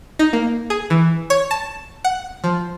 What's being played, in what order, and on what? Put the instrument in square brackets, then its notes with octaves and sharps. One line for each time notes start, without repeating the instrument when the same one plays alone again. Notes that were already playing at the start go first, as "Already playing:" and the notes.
[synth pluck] D#4
A#3
G#4
E3
C#5
A5
F#5
F3